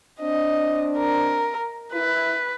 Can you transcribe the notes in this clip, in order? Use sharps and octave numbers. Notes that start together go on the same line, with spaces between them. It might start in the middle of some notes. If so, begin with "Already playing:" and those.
C4 D4 D#5
A#4
E4 B4